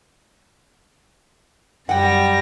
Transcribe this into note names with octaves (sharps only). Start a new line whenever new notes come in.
F#2 G3 F#5 G5 A#6